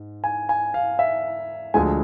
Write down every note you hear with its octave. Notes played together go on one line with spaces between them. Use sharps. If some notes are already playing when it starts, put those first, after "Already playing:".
Already playing: G#2
G#5
G#5
F5
E5
D2 D3 F3 G#3 G#5